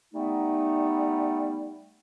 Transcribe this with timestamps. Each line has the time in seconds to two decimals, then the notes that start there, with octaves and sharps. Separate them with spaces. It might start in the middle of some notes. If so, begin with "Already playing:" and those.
0.14 G3 A3 B3 D#4